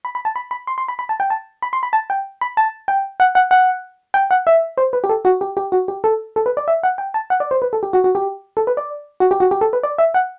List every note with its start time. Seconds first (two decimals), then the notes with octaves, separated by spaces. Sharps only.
0.05 B5
0.15 B5
0.25 A5
0.36 B5
0.51 B5
0.67 C6
0.78 C6
0.88 B5
0.99 B5
1.09 A5
1.20 G5
1.30 A5
1.62 B5
1.73 C6
1.83 B5
1.93 A5
2.10 G5
2.41 B5
2.57 A5
2.88 G5
3.20 F#5
3.35 F#5
3.51 F#5
4.14 G5
4.31 F#5
4.47 E5
4.78 C5
4.93 B4
5.04 G4
5.09 A4
5.25 F#4
5.41 G4
5.57 G4
5.72 F#4
5.88 G4
6.04 A4
6.36 A4
6.46 B4
6.57 D5
6.68 E5
6.83 F#5
6.98 G5
7.14 A5
7.30 F#5
7.40 D5
7.51 C5
7.62 B4
7.73 A4
7.83 G4
7.93 F#4
8.04 F#4
8.15 G4
8.57 A4
8.67 B4
8.77 D5
9.20 F#4
9.31 G4
9.40 F#4
9.51 G4
9.61 A4
9.73 B4
9.83 D5
9.98 E5
10.14 F#5